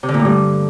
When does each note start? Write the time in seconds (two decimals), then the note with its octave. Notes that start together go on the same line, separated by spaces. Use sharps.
0.03 C3
0.09 D3
0.14 A#2
0.19 A2
0.25 G2